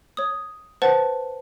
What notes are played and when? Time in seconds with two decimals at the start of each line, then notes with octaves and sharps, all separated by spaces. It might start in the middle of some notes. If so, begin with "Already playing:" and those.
0.17 C#5 D#6
0.82 B4 C5 F#5 A5 A6